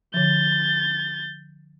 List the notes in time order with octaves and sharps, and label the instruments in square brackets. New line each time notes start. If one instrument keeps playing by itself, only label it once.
[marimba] D3 F3 [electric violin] G6 A6